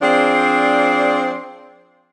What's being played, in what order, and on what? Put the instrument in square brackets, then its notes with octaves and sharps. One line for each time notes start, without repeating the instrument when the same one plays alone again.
[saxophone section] F3 C4 D4 G#4 C5 D5